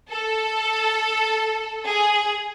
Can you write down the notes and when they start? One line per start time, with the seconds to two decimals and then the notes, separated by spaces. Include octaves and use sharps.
0.11 A4
1.85 G#4